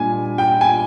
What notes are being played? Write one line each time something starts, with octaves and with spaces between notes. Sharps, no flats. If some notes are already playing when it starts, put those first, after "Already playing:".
Already playing: A#2 G3 D4 G#5
G5
G#5